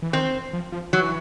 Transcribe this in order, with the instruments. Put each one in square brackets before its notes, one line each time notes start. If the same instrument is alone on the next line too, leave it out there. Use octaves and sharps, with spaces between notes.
[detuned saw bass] E3
[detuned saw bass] D#3 [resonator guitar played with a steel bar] C4
[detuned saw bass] F3
F3
[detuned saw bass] E3 [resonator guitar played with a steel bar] F#3